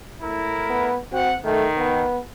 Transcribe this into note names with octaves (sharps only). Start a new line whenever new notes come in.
A2 E4 A#4
B3
C4 F#4 F#5 G5
D#3 A3
B3